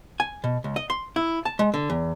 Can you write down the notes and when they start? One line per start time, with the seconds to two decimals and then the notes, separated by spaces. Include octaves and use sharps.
0.20 G#5
0.44 B2
0.64 C#2
0.76 D#5
0.90 C6
1.16 E4
1.45 A5
1.59 G#3
1.74 D3
1.90 E2